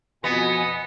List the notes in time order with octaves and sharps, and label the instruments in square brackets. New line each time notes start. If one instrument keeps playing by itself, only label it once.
[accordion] F2 B2 G#5 [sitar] B3 [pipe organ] D#5 [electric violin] C#7